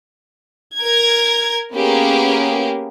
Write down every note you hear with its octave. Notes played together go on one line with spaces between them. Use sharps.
A#4 G#6
A#3 B3 C#4 G4 G#4 A#4